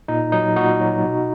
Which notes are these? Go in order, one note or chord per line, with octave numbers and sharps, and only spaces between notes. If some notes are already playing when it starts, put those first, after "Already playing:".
A#2 D#4
F#3 D#4
A#2 D#4 F#4
F#3
B2